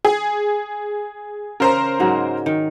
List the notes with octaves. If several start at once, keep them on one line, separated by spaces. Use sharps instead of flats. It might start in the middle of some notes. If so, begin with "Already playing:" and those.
G#4
C#3 A#4 C5 A#5
G#2 F#3 G#3
D#3